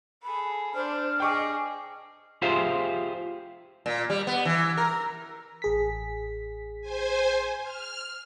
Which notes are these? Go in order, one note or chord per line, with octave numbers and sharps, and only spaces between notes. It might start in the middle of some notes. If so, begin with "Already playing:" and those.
G#4 A4 B5
D4 C5 F6
G#4 D#5 G5 C#6 D6
F4 G4 G#4 C5 E5 F5
A#2
G3
B3
E3
A#4
A1 G#4 B6
C5 G#5
F6